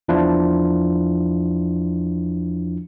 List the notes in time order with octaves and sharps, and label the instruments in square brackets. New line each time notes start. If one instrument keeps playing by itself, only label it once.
[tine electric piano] E2 F3 D4 E4 F4